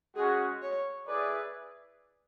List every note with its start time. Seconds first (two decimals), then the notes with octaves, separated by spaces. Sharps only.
0.16 G#3 C#4 F#4 G#4
0.62 C#5
1.07 E4 G#4 B4 D5